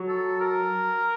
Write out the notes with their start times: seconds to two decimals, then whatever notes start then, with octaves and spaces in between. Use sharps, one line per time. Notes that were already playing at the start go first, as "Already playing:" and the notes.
Already playing: F#3
0.08 A4
0.40 A#4